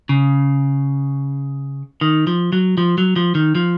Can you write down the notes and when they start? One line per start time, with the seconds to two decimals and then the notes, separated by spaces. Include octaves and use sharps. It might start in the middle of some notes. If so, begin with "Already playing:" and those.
0.09 C#3
2.01 D#3
2.27 F3
2.53 F#3
2.78 F3
2.98 F#3
3.16 F3
3.35 D#3
3.55 F3